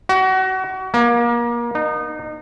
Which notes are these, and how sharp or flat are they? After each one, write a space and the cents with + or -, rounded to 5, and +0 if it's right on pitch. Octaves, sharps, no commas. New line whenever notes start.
F#4 +30
A#3 +30
D#4 -25